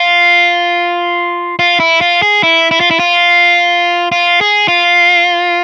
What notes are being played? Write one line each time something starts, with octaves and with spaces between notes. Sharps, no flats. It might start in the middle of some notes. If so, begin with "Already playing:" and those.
Already playing: F4
F4
E4
F4
G#4
E4
E4
F4
E4
F4
F4
G#4
F4